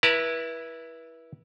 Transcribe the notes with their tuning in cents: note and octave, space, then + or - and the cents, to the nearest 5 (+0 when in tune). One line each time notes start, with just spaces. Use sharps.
E4 +0 B4 -30 A5 +35